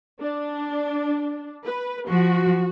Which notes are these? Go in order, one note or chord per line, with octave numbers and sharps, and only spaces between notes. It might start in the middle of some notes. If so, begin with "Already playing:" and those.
D4
B4
F3 F#4